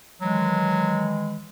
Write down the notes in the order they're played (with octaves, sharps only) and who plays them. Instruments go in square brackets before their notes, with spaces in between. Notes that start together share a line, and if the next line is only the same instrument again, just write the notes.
[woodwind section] D#3 E3 G#3 [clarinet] F#3